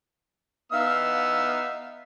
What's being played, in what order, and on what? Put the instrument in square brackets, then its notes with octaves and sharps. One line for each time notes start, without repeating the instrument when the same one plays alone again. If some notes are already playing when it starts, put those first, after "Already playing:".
[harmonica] B3 E6 [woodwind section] D#4 E5 F5